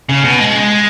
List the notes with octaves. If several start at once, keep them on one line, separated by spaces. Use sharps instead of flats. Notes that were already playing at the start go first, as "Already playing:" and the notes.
C#3
B2
G#3